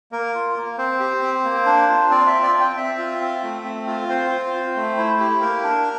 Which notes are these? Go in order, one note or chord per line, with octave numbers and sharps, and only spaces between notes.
A#3 A#4
F4
A#3
C4 C5
G4
C4
A#3
D4
F4
C4 D5
E5
F4
D5
C4
G5
C4 E5
F4
C4
A3
C4
F4
C4 C5
F4
C4
A3
E4
G4
A#3 A#4
D4